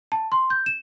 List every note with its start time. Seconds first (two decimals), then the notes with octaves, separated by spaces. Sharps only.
0.12 A5
0.32 C6
0.50 G6
0.66 E7